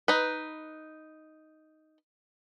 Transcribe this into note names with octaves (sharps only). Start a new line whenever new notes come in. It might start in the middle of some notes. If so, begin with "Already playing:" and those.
D#4 B4